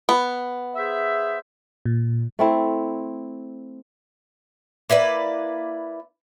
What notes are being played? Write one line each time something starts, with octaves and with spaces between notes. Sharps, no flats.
B3
G#4 C5 E5
A#2
A3 C4 E4
A#3 E4 B4 D5